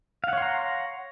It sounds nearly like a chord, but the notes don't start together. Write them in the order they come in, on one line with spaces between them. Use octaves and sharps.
F5 F#5 C#5 C6 A#5